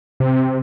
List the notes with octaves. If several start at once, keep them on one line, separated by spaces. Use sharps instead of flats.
C3